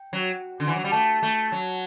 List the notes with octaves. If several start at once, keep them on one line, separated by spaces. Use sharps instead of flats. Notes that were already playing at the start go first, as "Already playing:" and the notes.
Already playing: G5
F#3
D3
E3
F#3
G3
A3 A5
A3
F#3